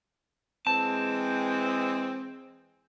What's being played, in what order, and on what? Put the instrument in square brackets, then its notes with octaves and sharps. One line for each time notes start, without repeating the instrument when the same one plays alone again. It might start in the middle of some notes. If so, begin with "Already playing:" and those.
[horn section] E3 G#3 C4 [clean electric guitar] A5